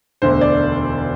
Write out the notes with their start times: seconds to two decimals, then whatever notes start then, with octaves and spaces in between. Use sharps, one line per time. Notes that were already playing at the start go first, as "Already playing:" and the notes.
0.22 E1 D2 D3 C5
0.41 D5